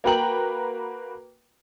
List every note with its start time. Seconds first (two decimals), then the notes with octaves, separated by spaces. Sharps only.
0.04 A#3 F#4 B4 G5 A#5 F#7